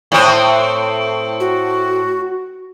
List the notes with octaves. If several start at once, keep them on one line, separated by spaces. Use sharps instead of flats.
A2 C4
F#4